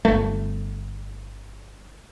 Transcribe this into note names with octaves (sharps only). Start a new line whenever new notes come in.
G1 A3